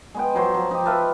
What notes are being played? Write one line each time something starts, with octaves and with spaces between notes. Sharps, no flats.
G#3 B3 G5
F3 F#3 C5
F3
D#4 G4
A4 B4 E5 F5